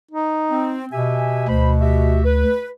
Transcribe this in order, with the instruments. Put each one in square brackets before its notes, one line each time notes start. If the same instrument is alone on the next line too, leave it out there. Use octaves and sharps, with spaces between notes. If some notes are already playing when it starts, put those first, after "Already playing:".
[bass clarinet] D#4
[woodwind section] C4
[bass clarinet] B2 [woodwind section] G4 E5 G#5
[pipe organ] D2 [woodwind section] C5 B5
[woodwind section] F#4 G4 E5
B4